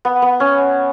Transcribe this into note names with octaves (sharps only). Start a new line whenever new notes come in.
B3
B3
C#4